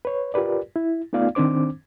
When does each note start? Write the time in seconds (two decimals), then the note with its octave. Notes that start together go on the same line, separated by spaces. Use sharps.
0.05 B4 C#5
0.34 F4 G4 A#4 B4 D5
0.76 E4
1.13 A3 B3 D#4 F4 D5 F5
1.35 D#3 C4 D4 C5 D6